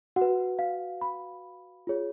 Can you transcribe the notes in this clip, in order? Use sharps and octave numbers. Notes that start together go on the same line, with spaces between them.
F#4 F#5
B4
F5
B5
F4 G#4 C#5